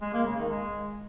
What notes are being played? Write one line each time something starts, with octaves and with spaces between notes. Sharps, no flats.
G#3
A#3
C#3
D#3
G#3